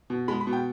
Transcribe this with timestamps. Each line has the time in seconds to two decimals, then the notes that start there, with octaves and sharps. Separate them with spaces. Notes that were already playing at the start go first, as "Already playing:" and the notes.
0.10 B2
0.28 G#3 B5
0.41 B5
0.47 B2
0.53 G5